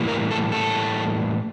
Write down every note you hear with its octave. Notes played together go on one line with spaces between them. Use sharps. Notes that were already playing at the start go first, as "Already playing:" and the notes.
Already playing: A2 E3 G3 A#3
A#4
A4
A4